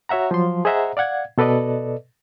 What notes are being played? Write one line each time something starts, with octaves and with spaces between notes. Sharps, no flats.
F#4 C#5 E5 F#5 A#5
F3 F#3 C6
G#4 C5 D#5 E5 F#5 A#5
D5 F5 F#5 G#6
B2 A4 B4 D5 D#5